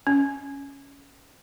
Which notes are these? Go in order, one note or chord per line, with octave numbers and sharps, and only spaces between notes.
C#4